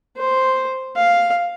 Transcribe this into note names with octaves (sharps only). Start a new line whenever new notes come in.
C5
F5